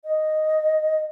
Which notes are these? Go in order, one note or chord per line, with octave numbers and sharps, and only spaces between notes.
D#5